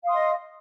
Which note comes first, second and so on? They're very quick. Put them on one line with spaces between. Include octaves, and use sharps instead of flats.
F5 D#6 C6 D#5